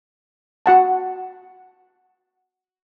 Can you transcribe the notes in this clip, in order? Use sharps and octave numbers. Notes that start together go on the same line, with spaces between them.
F#4 F#5 A5